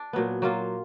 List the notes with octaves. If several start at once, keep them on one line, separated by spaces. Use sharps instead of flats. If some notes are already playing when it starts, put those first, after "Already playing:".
Already playing: D4
A#2 F#3 B3
F#3 A#3 F4